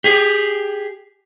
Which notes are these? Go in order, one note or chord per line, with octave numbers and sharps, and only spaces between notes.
G4 G#4